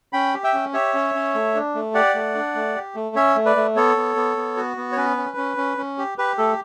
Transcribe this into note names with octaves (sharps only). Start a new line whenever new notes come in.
C#4 G5 B5
G4
E5 G5
C#4
G4 C#5 E5
C#4
C#4
A3
D4
A3
G4 D5 F#5
A3
D4
A3
G4
A3
C#4 C#5 E5
A3
B4 D5
A3
B3 A4 C#5
B3
B3
B3
F#4
B3
C#5
C#4 B4
C#4
C#4
C#4
C#4
G4
G4 B4
A3 A4